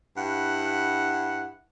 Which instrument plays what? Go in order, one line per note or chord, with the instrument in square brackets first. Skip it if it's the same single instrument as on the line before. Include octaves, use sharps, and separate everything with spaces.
[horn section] G2 E4 F#5